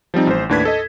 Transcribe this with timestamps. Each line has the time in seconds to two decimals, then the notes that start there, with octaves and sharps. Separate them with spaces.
0.14 F3 G3 C4 D#4
0.27 A1 C5
0.49 D#2 A2 D4 B4 G#6 B6
0.65 A4 D#5